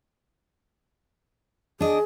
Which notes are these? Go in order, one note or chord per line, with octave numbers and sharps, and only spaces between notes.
D4 G#4 D#5